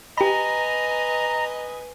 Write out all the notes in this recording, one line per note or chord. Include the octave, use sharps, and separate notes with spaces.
G4 B4 D#5 G#5 A#5 B5